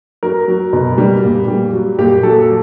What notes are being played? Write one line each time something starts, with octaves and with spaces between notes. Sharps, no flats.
F#3 A#4
F#3
B2
G3
A#2
G3
F#3
A#2 G4
F#3 A4